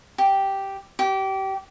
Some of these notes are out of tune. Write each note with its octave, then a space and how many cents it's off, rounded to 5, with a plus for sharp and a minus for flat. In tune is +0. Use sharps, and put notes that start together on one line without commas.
G4 -5
G4 -25